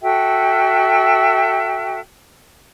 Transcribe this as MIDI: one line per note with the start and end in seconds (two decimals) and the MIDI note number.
0.02 1.99 66
0.02 1.99 69
0.02 1.99 76
0.02 1.99 79